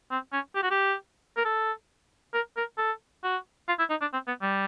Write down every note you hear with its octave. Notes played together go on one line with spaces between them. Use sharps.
C4
C#4
G4
F#4
G4
A#4
A4
A#4
A#4
A4
F#4
F4
E4
D#4
D4
C4
B3
G3